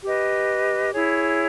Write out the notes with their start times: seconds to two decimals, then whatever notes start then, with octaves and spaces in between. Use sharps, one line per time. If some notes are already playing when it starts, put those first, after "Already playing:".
0.03 G4 B4 D#5
0.93 E4 G#4 C#5